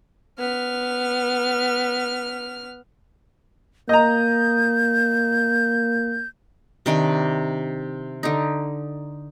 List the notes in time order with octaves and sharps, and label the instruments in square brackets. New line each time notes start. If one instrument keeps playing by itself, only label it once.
[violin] B3 F6
[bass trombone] A#3 [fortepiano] D#5 A#5 [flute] G6
[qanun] C3 D#3 D4 G#5
D3 D#4